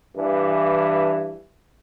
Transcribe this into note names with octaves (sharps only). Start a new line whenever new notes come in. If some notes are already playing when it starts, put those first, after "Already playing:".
G2 E3